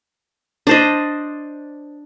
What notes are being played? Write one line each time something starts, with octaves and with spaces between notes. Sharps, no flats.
D4 C5 D#5